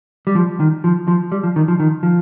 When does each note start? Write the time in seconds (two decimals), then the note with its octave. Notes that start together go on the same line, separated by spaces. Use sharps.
0.27 G3
0.35 F3
0.60 D#3
0.84 F3
1.08 F3
1.32 G3
1.43 F3
1.56 D#3
1.68 F3
1.80 D#3
2.03 F3